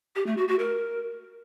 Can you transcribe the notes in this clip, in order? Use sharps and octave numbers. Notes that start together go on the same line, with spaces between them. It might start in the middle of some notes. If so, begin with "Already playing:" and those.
G4
A3
F#4
F#4
A#4